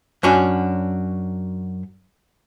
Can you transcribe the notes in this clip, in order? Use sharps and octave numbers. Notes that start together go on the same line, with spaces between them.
F#2 C#4 D4 F#4